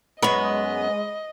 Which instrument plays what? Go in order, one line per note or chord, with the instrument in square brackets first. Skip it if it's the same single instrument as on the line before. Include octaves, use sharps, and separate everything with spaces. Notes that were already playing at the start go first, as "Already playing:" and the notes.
[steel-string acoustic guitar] F#2 B3 [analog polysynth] G#3 [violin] D#5 [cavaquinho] B5 C#6